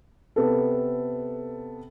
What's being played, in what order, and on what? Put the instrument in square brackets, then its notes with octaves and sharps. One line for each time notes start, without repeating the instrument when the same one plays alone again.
[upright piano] C3 B3 A4